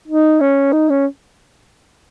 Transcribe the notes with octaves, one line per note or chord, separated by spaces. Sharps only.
D#4
C#4
D#4
C#4